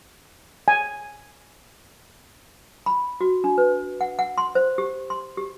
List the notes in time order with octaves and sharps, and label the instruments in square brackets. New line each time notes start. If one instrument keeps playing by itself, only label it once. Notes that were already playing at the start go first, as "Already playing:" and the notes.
[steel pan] G#5
[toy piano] B5
F#4
D4
B4
F#5
F#5
C6
C5
G4
C6
G4